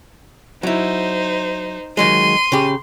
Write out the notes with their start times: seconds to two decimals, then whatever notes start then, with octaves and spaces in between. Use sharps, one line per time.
0.63 F#3 D#4 E4 C5
1.97 D#3 F#3 G#3 C6 D#7
2.52 C#3 G4